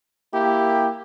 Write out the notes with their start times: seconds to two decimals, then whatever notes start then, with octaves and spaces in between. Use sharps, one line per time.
0.33 A#3 E4 G4